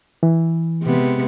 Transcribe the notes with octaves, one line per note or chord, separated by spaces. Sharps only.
E3
C3 G#3 B3